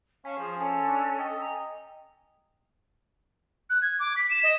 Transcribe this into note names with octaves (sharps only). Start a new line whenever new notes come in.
C#4 F5 G#5 A5 C#6 B6
F3 G#4
C#4 A4 G#5 A5
D4
D#5 G5
G#5 A#5
F#6
G#6
D6
B6
E7
D#5